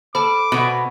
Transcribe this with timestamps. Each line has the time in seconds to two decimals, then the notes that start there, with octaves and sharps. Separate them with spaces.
0.15 A4 C5 A5 B5 D6
0.52 B2 E5 F#5 G#5